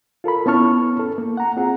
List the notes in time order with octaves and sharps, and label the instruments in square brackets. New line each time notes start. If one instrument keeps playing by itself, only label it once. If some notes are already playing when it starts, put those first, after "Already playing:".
[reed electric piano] F4 A4 A#4 B5
B3 C#4 E4 A5 C#6 F6
A4
A#3
F#5 A#5
C4 F4 G#4 F#5